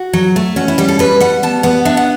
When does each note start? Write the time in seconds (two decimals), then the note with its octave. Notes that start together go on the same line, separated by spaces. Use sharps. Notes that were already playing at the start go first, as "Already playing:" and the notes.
Already playing: F#4
0.13 F#3
0.36 A3
0.56 C#4 F#4
0.68 E4
0.78 G3 G4
0.88 A4
0.99 G3 B4
1.20 G3 F#5
1.43 B3 A5
1.63 B3 F#5
1.85 D4 E5
1.97 F#5